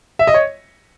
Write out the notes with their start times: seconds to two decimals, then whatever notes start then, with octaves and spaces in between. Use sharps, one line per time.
0.19 E5
0.27 D#5
0.34 C#5